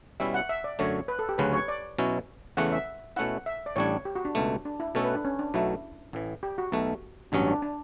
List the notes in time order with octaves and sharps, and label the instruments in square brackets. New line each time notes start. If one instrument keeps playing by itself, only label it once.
[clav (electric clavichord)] B2 G3 C#4 E4 [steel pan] E5
[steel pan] F#5
E5
D5
[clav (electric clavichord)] F#2 D3 A3 [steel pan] C#5
[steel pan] B4
A4
G4
[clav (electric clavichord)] D2 C#3 F#3 C#4 [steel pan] B4
[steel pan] C#5
D5
[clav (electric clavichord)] B2 F#3 C#4 E4
[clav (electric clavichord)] E2 C#3 E3 A3 C#4 [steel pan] F#5
[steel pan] E5
[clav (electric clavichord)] B2 A3 C#4 E4 [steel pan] F#5
[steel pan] E5
D5
[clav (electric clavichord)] A1 A2 G3 D4 [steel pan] C#5
[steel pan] G4
F#4
D4
[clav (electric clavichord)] C#2 B2 A3
[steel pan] D4
E4
[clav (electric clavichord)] B2 A3 C#4 [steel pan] A4
[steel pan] B4
D4
C#4
D4
[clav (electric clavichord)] B1 B2 F#3 A3 [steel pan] E4
[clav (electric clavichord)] A1 A2 E3
[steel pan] G4
F#4
[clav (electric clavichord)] B1 B2 A3
[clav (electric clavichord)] A1 G2 F#3 C#4 [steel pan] D4
[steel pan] D4
D4